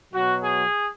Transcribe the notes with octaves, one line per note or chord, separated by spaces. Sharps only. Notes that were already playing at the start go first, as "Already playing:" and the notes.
B2 F#3 F#4
G#4